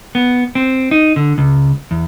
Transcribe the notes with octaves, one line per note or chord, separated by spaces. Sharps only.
B3
C4
D#4
D3
C#2
E2